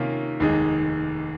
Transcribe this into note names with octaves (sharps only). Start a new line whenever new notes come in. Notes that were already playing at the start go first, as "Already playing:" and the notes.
Already playing: C3 D#3 A#3 C#4 F4
F1 D#2 D#3 G#3 D#4